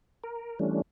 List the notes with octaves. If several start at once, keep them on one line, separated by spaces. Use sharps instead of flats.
A#4
E3 G3 A3 C#4 D4